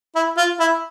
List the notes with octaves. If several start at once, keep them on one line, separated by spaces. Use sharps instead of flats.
E4
F4
E4